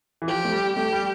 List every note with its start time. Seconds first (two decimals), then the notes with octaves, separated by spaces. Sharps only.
0.22 E3
0.28 F3 G4
0.45 A3
0.52 G3
0.76 A3 G4
0.92 G3